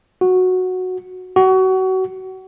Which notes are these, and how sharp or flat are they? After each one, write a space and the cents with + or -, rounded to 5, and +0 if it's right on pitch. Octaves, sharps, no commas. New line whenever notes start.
F#4 -5
F#4 +30